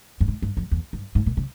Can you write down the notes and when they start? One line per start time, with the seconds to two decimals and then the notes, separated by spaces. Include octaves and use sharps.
0.21 G2
0.28 G#2
0.42 G2
0.57 F2
0.71 E2
0.93 G2
1.15 G#2
1.26 A#2
1.37 C#3